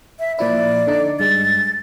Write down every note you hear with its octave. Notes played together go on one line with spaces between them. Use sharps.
E5
A#2 F3 E4 D5
D3 D#4
G2 G#3 A6